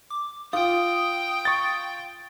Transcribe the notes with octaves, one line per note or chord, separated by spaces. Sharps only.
D6
F4 G5 D#6
C#6 A6